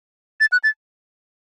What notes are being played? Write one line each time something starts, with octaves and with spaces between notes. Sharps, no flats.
A6
F#6
A6